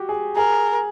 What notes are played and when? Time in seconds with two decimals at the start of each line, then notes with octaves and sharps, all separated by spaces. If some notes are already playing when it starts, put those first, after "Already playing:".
Already playing: F#4 G4
0.09 G#4
0.36 G#4 A#4